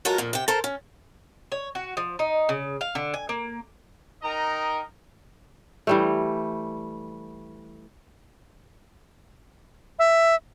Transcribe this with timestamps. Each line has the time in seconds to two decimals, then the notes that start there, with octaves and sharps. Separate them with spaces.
0.05 F#3 G#3 F4 A4 A#4
0.18 F2 A#2
0.33 C3 G5
0.48 A4 A#4 C5
0.64 C#4
1.52 C#5
1.75 F#4
1.97 F3
2.19 D#4
2.49 C#3
2.81 F5
2.95 D3
3.14 G#5
3.29 A#3
4.23 D#4 A#4 D#5 G5 A#5
5.87 E3 G3 A3
9.99 E5